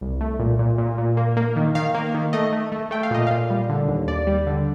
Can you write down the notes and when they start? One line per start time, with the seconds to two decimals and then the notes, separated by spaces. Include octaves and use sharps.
0.01 C2
0.21 A3
0.39 A#2
0.59 A#2
0.78 A#2
0.98 A#2
1.17 A#3
1.37 A#3
1.56 D#3
1.75 D#3 F5
1.94 A#3
2.14 D#3
2.33 A3 D#5
2.52 A3
2.72 A3
2.91 A3 G5
3.03 F5
3.11 A#2 D#5
3.27 A#2 F5
3.50 G3
3.70 D3
3.88 D#2
4.08 D#2 D5
4.27 G3
4.47 D3